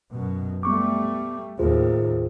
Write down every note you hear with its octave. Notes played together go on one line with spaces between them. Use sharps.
F#2 B2
G3 A3 B3 C#6 D6
D#2 A2 F4 G#4 C5